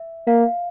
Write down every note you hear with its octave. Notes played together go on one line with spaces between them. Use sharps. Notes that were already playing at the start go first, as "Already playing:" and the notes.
Already playing: E5
A#3 F5